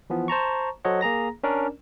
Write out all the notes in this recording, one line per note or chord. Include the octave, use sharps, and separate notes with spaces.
E3 F3 B3
C5 A5 A#5 C#6
F#3 A4 C5 C#5 D#5 F#5
A#3 G#4 A#5 A#6
C#4 D4 A#4 D5